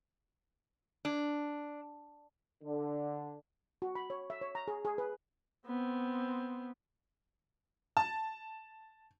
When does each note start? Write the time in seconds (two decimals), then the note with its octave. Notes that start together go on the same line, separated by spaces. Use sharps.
1.05 D4
2.63 D3
3.82 F#4
3.95 B5
4.10 C#5
4.30 E5
4.41 C#5
4.55 A#5
4.68 G#4
4.85 G#4
4.98 B4
5.67 B3 C4
7.97 A5